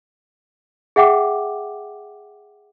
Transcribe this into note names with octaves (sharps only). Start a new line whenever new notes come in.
G#4 E5 F#5 G5 D6